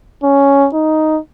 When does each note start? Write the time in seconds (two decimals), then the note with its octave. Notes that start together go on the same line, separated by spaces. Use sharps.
0.23 C#4
0.74 D#4